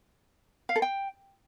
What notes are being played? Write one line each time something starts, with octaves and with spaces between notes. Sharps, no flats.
F5
A4
G5